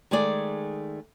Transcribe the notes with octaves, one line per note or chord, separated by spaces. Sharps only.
D#3 G#3 A3 G#4 D5